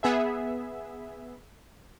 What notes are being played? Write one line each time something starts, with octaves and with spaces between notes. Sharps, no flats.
B3 G#4 E5